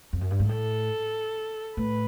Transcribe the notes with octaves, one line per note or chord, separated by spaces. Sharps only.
F2
F#2
G2
G#2
A2 A4
A2 B4